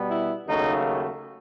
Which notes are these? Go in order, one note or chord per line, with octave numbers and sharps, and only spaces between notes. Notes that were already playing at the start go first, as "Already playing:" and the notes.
Already playing: B2 G3 B3
E4
D#2 C#3 F#3 A3 D#4